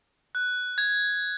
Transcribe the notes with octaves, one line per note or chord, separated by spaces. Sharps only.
F#6
G#6